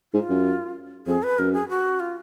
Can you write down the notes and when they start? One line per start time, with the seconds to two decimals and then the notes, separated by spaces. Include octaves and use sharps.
0.13 G#2 F4
0.29 F#2
1.07 F2 G#4
1.23 B4
1.38 F#2 A#4
1.54 G#4
1.69 F#4
2.00 F4